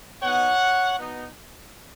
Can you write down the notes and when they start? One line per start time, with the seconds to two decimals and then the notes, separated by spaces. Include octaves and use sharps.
0.22 B2 B3 D#4 C#5 F#5
0.99 B2 B3 D#4